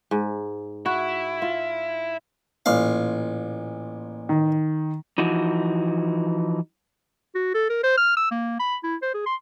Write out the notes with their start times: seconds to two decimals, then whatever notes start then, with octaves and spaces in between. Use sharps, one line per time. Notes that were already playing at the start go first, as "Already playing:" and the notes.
0.11 G#2
0.86 E4 F#4
1.42 F4
2.66 A1 A#2 F5
4.29 D#3
5.18 E3 F3 D#4 F#4
7.35 F#4
7.55 A4
7.69 A#4
7.83 C5
7.97 F6
8.17 E6
8.31 A#3
8.59 B5
8.83 E4
9.02 C5
9.14 G#4
9.26 C6